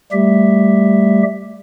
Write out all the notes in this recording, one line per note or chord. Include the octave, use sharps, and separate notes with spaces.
G3 A3 G4 E5